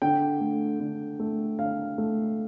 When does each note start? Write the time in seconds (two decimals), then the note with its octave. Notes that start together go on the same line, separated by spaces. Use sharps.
0.02 D3 G5
0.41 A3
0.80 D3
1.19 A3
1.59 D3 F5
1.98 A3